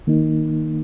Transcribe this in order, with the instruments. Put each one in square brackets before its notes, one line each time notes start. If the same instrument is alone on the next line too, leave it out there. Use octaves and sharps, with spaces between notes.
[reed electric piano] D#3 A#3 D#4